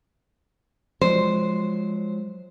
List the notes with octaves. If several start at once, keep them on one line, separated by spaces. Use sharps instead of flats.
F3 F#3 G#3 C5